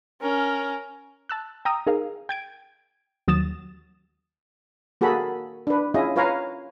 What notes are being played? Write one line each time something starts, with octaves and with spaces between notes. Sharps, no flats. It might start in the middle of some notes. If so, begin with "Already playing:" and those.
C#4 A#4
A5 E6 F#6
G5 A#5 D#6 E6
D#4 G#4 A#4 F5
G5 G#6 D7
D#2 F#3 D#6 A6 E7
A#3 F#4 G#4 A4 B5
D4 B4
C#4 E4 F4 G#4 D#5
F4 B4 C#5 F5 G#5 A#5